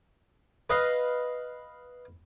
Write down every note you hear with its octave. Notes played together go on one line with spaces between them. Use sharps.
B4 D#5 F5